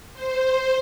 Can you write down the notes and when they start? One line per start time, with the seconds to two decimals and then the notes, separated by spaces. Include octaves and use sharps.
0.13 C5